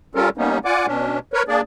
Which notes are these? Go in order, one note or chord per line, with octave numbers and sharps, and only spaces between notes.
G3 C#4 F4 A4 A#4
G3 A#3 B3 C#4 D#4
F4 D5 F#5 G#5 D6
B2 C#4 D4
A#4 B4 C#5
A#3 D4 G#4 D5